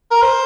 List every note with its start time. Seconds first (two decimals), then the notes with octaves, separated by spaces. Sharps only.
0.11 A#4
0.22 C5